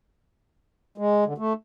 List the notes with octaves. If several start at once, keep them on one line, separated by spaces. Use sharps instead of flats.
G#3
D3
A3